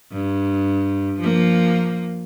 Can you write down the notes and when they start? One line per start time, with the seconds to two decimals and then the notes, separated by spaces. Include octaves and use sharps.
0.12 G2
1.20 F3 A#3